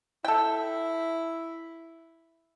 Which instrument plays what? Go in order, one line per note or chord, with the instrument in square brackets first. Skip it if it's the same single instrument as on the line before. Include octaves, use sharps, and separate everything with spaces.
[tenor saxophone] E4 [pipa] A4 G5